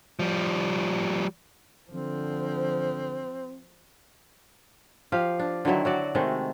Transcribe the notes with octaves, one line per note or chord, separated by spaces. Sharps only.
F3 G3
D3 F3 C4
F3 G4 F5
D4
D3 D#3 F#3 E4
F#3 F#4 D5
C3 D#3 G#3 A3